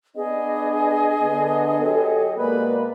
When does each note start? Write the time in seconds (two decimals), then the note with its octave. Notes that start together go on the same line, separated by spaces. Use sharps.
0.16 B3 D4 G#4 D#5
1.21 D3 B3
1.80 F#3 G4 A4
2.37 B2 G#3 A#3 B4 D5 B5